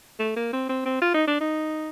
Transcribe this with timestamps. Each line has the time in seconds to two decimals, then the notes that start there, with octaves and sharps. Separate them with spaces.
0.19 A3
0.36 A#3
0.52 C4
0.69 C4
0.85 C4
1.02 F4
1.14 D#4
1.27 D4
1.40 D#4